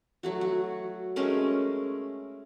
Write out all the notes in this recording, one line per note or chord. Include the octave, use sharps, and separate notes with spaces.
F#3 A3 F#4
F#4
G#3 A3 C#4 A#4